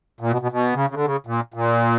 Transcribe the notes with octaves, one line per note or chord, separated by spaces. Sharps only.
A#2
B2
B2
B2
C#3
C#3
D3
C#3
A#2
A#2